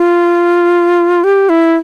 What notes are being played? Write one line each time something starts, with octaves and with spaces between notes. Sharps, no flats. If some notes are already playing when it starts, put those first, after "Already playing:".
Already playing: F4
G4
E4